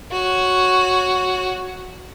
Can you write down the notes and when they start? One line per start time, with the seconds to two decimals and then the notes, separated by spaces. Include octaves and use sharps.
0.11 F#4 C#5